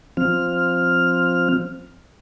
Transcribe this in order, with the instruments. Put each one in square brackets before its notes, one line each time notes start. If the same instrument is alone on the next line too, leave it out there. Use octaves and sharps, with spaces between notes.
[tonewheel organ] F3 C4 F6